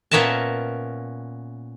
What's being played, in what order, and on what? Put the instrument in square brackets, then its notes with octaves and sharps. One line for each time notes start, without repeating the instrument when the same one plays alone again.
[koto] A#2 B3 C#4 A#4 E5 A5